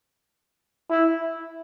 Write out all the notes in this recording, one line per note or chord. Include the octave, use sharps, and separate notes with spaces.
E4